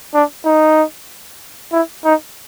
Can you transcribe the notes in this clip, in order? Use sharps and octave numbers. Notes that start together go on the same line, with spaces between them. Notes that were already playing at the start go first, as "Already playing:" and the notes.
D4
D#4
E4
D#4